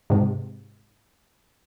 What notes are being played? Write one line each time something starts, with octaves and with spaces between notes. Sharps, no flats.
G#2 C3